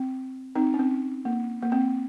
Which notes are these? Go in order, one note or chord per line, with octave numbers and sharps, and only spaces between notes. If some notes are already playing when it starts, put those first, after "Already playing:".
Already playing: C4
C4 D#4
C#4
C4
A#3
A#3
C4